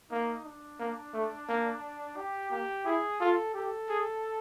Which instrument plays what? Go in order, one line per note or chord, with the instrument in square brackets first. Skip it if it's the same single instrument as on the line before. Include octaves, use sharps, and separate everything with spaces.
[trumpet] A#3 [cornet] D#4
[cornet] D4
[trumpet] A#3
A3
A#3
[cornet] G4
[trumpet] A#3 [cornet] G4
[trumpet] E4 [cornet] G#4
[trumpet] F4 [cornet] A4
[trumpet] G4 [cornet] A4
[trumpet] G#4